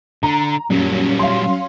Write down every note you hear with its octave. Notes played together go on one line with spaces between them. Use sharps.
D3 A#5
F#2 A#2 F#3 G3 C#4
F5 C6